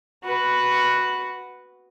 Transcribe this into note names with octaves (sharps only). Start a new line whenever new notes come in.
F#4 B4